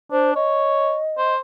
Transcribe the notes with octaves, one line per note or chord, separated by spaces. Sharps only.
D4 C5
C#5 D#5
C5